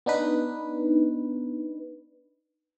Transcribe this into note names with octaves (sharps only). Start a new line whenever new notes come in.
B3 D4 D#4 B4